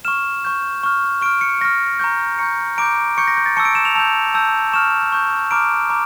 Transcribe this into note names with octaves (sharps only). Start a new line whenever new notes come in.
C#6 F6 E7
C#6 G6
C#6 F6
C#6 F6 D7
C#7
C#6 F6 A#6
A#5 C#6 G6
A#5 C#6 G6 C#7
A#5 D6 G6 D7
C#6 G6 C#7
A#6
G6
A6
A5 C#6 E6 C#7
D7
E7
F7
A5 E6 G6 F7
A5 E6 G6
C#6 F6 E7
C#6 G6
A#5 D6 F6 D7
A#5 D6